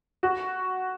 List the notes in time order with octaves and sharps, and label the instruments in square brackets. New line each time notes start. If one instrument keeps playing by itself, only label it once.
[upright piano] F#4